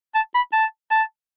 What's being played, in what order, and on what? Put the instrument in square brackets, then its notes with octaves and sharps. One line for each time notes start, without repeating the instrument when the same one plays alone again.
[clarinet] A5
B5
A5
A5